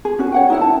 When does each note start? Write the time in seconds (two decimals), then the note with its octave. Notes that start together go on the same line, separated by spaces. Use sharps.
0.05 G#4
0.19 C#4 F#4
0.32 C#5 F#5 G5
0.50 D#4 E4 F#5
0.61 A5